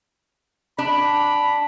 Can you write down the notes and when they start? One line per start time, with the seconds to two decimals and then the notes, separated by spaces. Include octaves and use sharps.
0.78 D4 B5